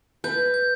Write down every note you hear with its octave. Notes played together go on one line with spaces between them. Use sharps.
B4 G6
G6